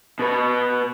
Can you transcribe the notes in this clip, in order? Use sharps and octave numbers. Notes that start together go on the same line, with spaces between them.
B2 B4